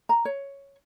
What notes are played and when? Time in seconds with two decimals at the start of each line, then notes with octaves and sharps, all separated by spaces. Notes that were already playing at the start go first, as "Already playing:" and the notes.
0.09 A#5
0.25 C#5